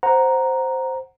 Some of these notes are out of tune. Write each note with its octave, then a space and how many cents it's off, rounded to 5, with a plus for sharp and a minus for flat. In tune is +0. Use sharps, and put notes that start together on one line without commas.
C5 +0 F#5 +0 A#5 +0